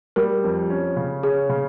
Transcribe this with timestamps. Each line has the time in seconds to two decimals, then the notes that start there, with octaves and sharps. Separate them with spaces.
0.16 G3 A#4
0.44 F2
0.70 C#4
0.97 C#3
1.23 C#4 G#4
1.50 C#3